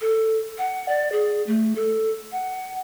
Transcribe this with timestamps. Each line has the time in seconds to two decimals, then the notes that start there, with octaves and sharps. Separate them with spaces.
0.01 A4
0.58 F#5
0.89 D5
1.12 G#4
1.47 A3
1.76 A4
2.32 F#5